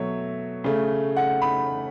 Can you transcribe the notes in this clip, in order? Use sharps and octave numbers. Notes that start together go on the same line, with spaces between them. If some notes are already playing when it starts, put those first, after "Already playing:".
Already playing: B2 F#3 A3 C#5 E5
C#3 A3
F#5
B5